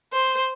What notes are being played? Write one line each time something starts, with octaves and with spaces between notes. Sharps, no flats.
C5